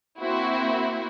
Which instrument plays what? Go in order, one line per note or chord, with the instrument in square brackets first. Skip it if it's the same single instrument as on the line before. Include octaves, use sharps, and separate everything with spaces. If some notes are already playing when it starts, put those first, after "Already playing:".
[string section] A#3 C4 E4 F#4